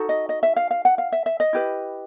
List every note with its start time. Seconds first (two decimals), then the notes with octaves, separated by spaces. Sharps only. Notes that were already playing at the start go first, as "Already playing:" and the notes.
Already playing: D#4 F#4 A4
0.09 D#5
0.29 D#5
0.43 E5
0.56 F5
0.71 F5
0.85 F#5
0.98 F5
1.12 E5
1.26 E5
1.40 D#5
1.53 E4 G4 B4